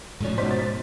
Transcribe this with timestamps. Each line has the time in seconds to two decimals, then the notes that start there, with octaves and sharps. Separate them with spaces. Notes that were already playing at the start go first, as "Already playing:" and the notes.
0.20 G#2 B2 F3 A3 C#4
0.37 G#2 B2 C5 B6
0.51 A6